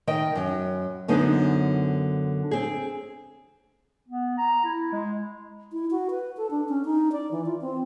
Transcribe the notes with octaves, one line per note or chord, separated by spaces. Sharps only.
D#3 D#5 G5
F#2
F#2 D3 B3 D#4 C5
C4 G#4
B3
A#5
E4
G#3
E4
F#4
B4
A4
D4
C#4
D#4
D5
E3
F4
C4